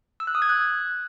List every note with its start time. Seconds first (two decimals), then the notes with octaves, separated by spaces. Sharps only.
0.20 E6
0.27 F#6
0.35 D#6
0.42 G#6
0.49 F#6